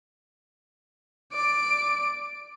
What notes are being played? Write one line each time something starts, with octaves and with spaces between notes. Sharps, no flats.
D5 D7